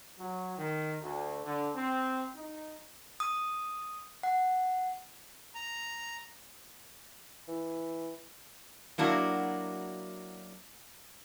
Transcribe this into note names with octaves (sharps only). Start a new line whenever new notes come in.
F#3
D#3
D2
D3
C4
D#4
D#6
F#5
A#5
E3
F#3 A#3 D4 E4 F#4